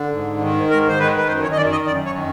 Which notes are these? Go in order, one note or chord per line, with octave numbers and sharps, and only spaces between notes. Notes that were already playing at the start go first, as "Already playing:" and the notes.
Already playing: D3
G#2
D#3
G#2 A#4
C5
D#3 B4
B4
F#2 C5
C#5
D#5
D#3 D5
D#5
F#2 D5
C#5
D#3